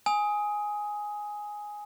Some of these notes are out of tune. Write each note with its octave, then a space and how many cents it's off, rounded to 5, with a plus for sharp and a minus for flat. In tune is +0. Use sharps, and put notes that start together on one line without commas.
G#5 +0 D#6 +15